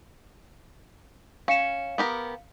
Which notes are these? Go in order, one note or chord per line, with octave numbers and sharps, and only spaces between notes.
C#4 F5 C#7 E7
B3 G4 A#4